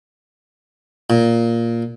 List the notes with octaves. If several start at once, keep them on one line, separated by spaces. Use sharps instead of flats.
A#2